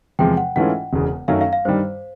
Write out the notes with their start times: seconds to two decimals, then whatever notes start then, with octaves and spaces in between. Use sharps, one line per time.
0.19 E2 C3 F3 G#3 G5
0.37 F#5
0.56 G#2 E3 A3 C#4 F4 F#5
0.93 E1 E2 C#3
1.28 F#2 D#3 F#3 A3 C#4 F5
1.41 F5
1.53 F5
1.65 G2 D#3 G3 C5